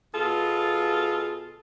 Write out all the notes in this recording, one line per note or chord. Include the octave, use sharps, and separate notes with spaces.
B2 F4 G#4 A4